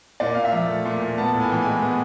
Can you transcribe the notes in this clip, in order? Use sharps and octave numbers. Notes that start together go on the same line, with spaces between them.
A#2 D5
A#2 F5
E5
F3
A3
A#2
A#2
B3 A5
A2
G#5
E3 G5
G#3 G#5
B3